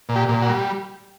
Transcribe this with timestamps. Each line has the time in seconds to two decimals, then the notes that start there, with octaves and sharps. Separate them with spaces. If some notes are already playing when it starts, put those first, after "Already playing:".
0.09 A#2
0.16 G4
0.29 A#2
0.42 F#4
0.49 G3